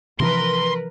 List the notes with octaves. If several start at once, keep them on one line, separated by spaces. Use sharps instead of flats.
C3 E3 F3 A#4 B4 C6